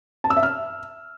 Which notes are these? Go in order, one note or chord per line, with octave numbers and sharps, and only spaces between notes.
A5
E6
E5
F6